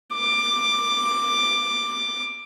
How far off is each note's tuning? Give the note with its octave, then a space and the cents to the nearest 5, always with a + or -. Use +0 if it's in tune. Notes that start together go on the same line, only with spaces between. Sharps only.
D6 +10